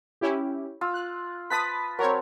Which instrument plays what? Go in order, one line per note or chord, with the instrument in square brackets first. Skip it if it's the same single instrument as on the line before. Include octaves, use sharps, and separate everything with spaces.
[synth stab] C#4 E4 G4
[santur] F4 E6
[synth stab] F#6
[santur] B4 A5 B5 [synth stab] D#6 B6
[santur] F#3 C4 [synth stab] A#4 C#5